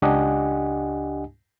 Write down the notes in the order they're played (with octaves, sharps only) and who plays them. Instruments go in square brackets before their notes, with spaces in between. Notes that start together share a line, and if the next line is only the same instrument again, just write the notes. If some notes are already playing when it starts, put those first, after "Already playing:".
[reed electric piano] C#2 D4 G4 D#5 F#5 G#5